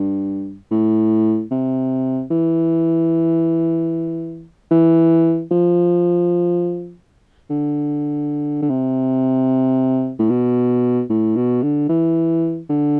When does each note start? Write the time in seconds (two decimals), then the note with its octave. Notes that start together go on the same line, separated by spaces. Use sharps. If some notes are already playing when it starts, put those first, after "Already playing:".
Already playing: G2
0.71 A2
1.51 C3
2.31 E3
4.71 E3
5.51 F3
7.50 D3
8.62 D3
8.69 C3
10.19 A2
10.30 B2
11.09 A2
11.36 B2
11.63 D3
11.89 E3
12.70 D3